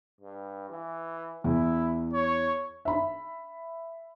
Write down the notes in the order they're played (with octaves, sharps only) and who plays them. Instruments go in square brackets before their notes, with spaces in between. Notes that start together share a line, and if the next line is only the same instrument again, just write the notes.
[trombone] G2
E3
[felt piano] E2 [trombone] E4
[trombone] C#5
[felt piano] E5 B5